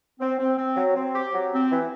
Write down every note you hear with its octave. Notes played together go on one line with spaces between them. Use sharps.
C4
C4
C4
F#3
C4
G4
F#3
C4
E3